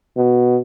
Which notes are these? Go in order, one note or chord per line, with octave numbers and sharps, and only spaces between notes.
B2